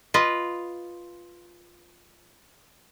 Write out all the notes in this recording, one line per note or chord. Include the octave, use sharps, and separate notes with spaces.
F4 B4 D#5